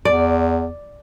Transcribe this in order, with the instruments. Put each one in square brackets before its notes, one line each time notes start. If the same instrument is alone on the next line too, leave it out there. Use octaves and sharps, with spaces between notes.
[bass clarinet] E2 [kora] D5